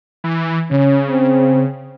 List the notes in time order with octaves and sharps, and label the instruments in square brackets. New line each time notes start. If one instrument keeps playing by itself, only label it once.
[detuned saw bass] E3
[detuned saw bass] C#3 [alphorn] C#4
[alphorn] C4